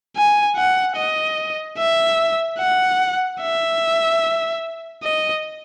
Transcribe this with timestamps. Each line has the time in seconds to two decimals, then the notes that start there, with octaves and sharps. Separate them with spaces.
0.17 G#5
0.57 F#5
0.96 D#5
1.78 E5
2.59 F#5
3.41 E5
5.03 D#5